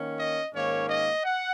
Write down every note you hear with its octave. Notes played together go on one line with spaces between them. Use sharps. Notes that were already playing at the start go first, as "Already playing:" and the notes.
Already playing: D#3 A#3 C#4
D#5
G#2 D#3 A#3 C#4 C#5
D#5
F#5